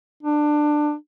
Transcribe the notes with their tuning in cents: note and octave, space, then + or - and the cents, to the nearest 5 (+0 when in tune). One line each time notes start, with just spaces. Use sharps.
D4 +20